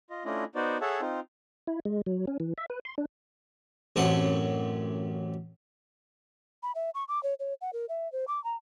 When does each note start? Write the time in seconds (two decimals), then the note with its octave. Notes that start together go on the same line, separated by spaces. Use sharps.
0.10 F4 D#5
0.25 A3 C#4 D4 E4 F4 D#5
0.55 B3 D#4 F#4 C5 D5
0.81 G#4 A4 C#5 E5 F#5 A5
1.01 C4 D#4 F4
1.67 E4
1.85 G#3
2.06 F#3
2.27 C#4
2.40 E3
2.58 E5
2.70 B4
2.85 C6
2.98 D4
3.96 A1 F#2 A3 C4 F#5 C6
6.63 B5
6.75 E5
6.95 C#6
7.08 D6
7.23 C#5
7.40 C#5
7.61 F#5
7.73 A#4
7.89 E5
8.12 C5
8.28 D6
8.44 A#5